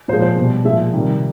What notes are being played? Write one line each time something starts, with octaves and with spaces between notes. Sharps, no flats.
A#2 F3 G#3 C5
C5
B2 G3
A#2 F3 G#3 E5
C3 D#3 G3